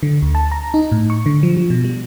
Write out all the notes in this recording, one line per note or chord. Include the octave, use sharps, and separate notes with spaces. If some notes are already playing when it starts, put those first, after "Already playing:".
D3
D2
A5
A#5
D#4
A2
C#6
D3
F3
F3
B2
G3